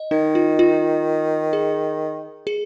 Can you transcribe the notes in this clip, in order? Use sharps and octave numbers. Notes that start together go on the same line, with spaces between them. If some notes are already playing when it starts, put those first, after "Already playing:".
Already playing: D#5
D#3 D#4
F4
F4
G#4
G#4